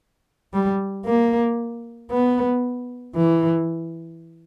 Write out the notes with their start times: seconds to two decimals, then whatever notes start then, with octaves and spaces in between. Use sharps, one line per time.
0.53 G3
1.06 A#3
2.11 B3
3.16 E3